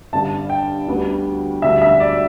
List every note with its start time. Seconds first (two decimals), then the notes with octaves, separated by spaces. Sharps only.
0.13 G1 G2 D3 A5
0.50 G5
0.88 D2 D3 G3 B3
1.62 E1 D2 D3 G3 E5
1.82 E5
2.00 D5